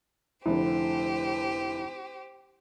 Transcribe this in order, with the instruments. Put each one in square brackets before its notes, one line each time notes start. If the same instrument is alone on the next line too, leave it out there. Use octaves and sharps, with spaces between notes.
[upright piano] F1 D3 [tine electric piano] E4 [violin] G4 C5